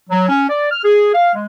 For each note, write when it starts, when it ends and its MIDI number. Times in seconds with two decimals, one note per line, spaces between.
0.10 0.27 54
0.29 0.45 61
0.49 0.67 74
0.71 0.82 89
0.84 1.09 68
1.14 1.31 77
1.34 1.46 56